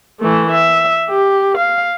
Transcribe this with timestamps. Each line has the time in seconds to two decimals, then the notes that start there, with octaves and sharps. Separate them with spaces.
0.20 E3 A3
0.51 E5
1.09 G4
1.58 F5